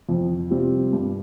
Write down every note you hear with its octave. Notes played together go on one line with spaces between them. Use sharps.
F2
C3 G3 C4 F4
G2